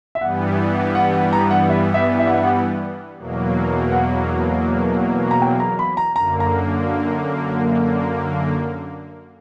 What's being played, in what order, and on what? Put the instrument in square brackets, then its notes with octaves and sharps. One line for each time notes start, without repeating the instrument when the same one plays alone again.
[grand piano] E5
[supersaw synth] G2 E3 G3 B3 [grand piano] F#5
[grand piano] F#5
F#5
A#5
F#5
E5
E5
E5
F#5
E5
F#5
[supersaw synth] E2 B2 F#3 A#3
[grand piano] F#5
A#5
G5
A#5
B5
A#5
[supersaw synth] F#2 D3 A#3 [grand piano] A#5
[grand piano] A#5